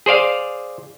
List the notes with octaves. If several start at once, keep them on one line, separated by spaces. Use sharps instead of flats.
G#4 C5 D5 F5